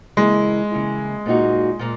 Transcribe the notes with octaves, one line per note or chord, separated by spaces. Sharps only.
C#3 E3 G#3 A#3 E4
C#3 E3 A#3 E4
A#2 A#3 D#4 F#4
A#2 A#3